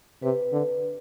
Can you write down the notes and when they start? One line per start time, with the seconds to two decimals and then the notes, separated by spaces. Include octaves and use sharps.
0.23 C3 B4
0.52 D3